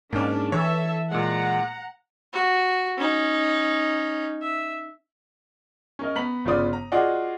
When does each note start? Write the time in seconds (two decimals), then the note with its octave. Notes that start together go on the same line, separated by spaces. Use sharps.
0.13 G#2 A#3 C#4 D4
0.52 E3 A4 C#5 E5
1.11 A#2 G#3 F#5 A#5
2.33 F#4
2.98 C#4 D#4
4.41 E5
5.99 C#4 A#4 D#5
6.15 B3 A#5 B6 F#7
6.45 G1 C#3 B3 F4 D5 D#6
6.73 A#5
6.92 F4 F#4 G#4 D5 D#5 F#5